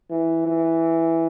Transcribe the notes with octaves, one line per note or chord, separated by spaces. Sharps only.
E3
E3